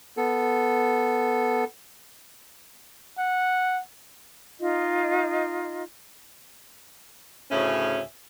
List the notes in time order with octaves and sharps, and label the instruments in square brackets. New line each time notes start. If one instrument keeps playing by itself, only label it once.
[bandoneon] B3 A4
[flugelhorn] F#5
[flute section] D#4 F4 D#5
[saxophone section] D2 A2 C#3 C#4 E5